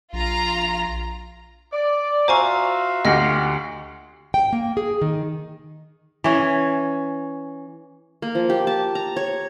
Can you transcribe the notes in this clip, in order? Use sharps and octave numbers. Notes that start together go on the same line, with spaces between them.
A#1 F4 A#5
D5
F4 F#4 C5 E5 G#5 A#5 C#6
D2 F4 G4 D#5 F#5 A#6
G5
A#3
G#4
D#3
E3 C#4
A#3
F3
G4
A5
A#5
C#5